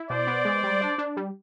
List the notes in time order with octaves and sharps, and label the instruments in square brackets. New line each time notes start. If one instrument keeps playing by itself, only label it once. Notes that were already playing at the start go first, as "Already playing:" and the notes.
Already playing: [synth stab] E4
[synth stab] B2 [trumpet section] C5 D5
[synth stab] B3
G#3
G3
D4
D4
G3